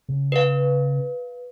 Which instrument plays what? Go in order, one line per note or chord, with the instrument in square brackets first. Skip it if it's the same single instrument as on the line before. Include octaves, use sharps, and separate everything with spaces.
[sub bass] C#3
[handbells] B4 F5